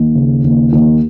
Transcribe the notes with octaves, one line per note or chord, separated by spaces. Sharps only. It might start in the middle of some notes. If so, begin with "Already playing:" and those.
Already playing: D#2
C#3
D#2
D#2